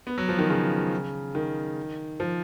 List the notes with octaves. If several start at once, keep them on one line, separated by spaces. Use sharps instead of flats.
B3
F#3
F3
D#3
C#3
D#3
F3